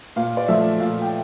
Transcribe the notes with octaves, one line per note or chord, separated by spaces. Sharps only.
A#2 F5
D5
F3 A3 E5
A#2 F5
G5